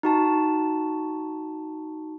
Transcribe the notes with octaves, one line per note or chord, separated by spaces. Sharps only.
D#4 F#4 A5